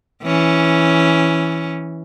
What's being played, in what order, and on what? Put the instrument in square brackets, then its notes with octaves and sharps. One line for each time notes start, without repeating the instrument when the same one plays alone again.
[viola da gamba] E3 C#4